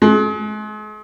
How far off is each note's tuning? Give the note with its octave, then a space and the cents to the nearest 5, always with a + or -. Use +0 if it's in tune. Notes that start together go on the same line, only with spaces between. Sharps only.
G#3 +40